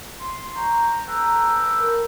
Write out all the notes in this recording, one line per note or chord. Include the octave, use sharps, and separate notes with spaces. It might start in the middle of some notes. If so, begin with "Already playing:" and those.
C6
F#4 C5 A#5
A4 B4 G5
A#4